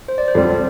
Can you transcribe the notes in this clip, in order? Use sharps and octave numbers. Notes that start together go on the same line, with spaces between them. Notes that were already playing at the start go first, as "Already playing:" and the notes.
C5
D5
C5
F2 D3 G3